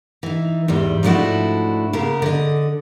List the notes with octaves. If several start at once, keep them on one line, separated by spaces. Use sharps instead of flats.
E3 D#4
E2 G#2 G3
G#2 F3 A3 D4 E4 F#4
C#3 A#3 B3 A#4
D3 D#5